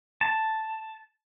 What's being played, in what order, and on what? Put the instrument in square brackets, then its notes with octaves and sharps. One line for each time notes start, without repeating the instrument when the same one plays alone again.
[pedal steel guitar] A5